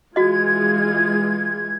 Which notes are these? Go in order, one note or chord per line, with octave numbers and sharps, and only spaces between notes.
E3 G#3 F4 F#4 D#5 G#6